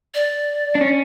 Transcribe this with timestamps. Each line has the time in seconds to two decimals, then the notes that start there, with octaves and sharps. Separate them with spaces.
0.15 D5
0.75 D4
0.81 C#4